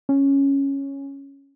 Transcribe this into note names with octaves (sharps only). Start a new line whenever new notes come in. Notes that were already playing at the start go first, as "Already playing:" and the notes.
C#4